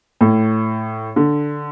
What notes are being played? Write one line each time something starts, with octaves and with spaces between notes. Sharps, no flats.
A2
D3